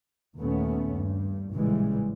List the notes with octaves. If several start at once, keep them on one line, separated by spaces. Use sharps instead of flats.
D#2 A#2 A3 B3 C#4
G2
A1 A#2 C#3 E3 G3 G#3